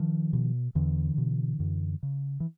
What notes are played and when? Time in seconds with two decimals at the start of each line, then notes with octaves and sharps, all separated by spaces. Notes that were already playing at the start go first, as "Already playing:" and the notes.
Already playing: D#3 F3
0.33 B2
0.75 E2 D3 E3
1.18 B2
1.60 F#2
2.03 C#3
2.40 E3